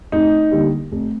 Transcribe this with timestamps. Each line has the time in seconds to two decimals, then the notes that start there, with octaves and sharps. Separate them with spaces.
0.12 F1 D#4
0.51 D#2 D3 G3
0.91 F1